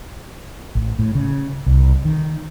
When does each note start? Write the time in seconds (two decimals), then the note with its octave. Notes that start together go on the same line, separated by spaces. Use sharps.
0.75 A1
0.99 A2
1.15 C#3
1.66 C2
2.05 D#3